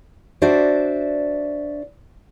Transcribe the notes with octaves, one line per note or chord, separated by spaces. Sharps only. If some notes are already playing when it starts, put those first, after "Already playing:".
D4 F#4 C5 D5 E5